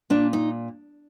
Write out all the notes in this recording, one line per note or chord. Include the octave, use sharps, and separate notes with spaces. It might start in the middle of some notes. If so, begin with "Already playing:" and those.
A#2 D4
D#4